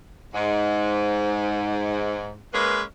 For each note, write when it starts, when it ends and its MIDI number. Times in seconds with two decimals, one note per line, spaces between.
0.35 2.37 44
2.54 2.82 56
2.54 2.82 58
2.54 2.82 61
2.54 2.82 71